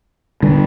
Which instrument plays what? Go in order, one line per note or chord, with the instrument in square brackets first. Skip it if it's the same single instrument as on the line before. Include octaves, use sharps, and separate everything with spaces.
[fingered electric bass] D3 G3